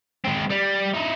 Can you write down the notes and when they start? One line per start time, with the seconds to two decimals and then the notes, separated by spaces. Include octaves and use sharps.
0.25 G#3 C4
0.50 G3
0.94 D#4 E4